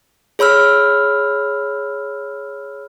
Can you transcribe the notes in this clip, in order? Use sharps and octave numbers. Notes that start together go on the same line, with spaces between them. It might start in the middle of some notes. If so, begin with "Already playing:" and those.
G#4 C#5 B5 E6 F6